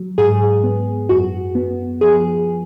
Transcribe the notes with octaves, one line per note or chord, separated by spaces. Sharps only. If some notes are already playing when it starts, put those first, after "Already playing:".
Already playing: F#3
G#2 G#4
B3
F#2 F#4
B3
F3 G#4